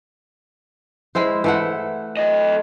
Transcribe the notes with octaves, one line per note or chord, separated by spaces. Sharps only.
G#3 E4 C5
E3 A3 F#5
A4 D#5